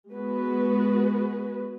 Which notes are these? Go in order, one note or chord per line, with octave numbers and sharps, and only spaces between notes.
G#3 B3 F#4 B4